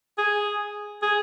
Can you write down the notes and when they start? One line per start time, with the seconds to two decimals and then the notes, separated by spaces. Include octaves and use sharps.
0.18 G#4
1.02 G#4